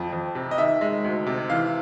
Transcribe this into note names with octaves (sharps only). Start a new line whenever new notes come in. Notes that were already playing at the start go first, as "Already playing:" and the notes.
Already playing: F2 F3
F2
C3
D#5
D#3 E5
G#3
D2
C3
E3 F5